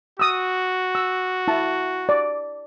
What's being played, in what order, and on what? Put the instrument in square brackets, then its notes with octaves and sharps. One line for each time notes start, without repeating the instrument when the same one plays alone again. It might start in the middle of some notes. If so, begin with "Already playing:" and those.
[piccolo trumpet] F#4 [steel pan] D#6 E6
[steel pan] E6
E4 A5
D5